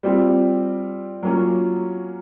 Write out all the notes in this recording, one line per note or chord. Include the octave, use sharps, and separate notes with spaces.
G3 C4 F4
F#3 A#3 C#4 F4